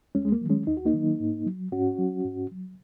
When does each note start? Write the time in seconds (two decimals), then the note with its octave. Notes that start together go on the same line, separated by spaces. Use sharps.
0.15 D#2 G#3 C#4
0.25 G#3
0.32 A#3
0.41 D#3 F#3
0.50 G#3 C#4
0.67 D#2 D#4
0.77 F#4
0.86 A#3 D#4
0.93 D#3 F#3
1.20 G#2
1.46 F#3
1.72 G#2 C#4 F#4
1.98 F#3
2.25 G#2
2.51 F#3